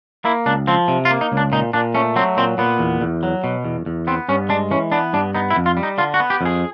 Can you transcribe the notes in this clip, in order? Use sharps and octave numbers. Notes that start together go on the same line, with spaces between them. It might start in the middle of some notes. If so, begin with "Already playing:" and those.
A#3 E4
C#2 D4
F3 C4
C3
F4
A#3
D#4
C#2
D4
A#2 D#4
A#2 D4
A3 C#4
F#3 C4
A#2 C4
A#2 B3
E2
E2
F#3
B2
E2
E2
B3 C4
G2 C#4
G#3 D4
E3 C#4
B3 D4
G2 D4
B3 D#4
E4
F2
F4
G3
D#4
D3 F4
F#4
B3
G4
F2 G#4